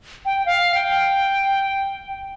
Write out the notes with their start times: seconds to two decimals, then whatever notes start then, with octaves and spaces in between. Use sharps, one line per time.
0.25 G5
0.46 F5
0.74 G5